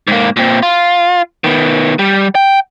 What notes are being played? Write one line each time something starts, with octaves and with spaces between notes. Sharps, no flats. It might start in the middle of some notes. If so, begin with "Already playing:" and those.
G#2 A#3
A#2 C4
F4
D#3 B3
G3
G5